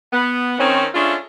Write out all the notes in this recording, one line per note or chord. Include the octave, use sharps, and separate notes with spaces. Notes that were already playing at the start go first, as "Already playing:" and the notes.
B3
D#3 C4 C#4
G#3 A3 C#4 D4 F4